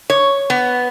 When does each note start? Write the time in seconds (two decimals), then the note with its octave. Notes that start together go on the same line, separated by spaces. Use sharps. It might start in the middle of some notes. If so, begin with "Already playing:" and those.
0.10 C#5
0.50 B3